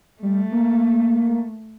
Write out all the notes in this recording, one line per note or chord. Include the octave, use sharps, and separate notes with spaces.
G3 A3
A#3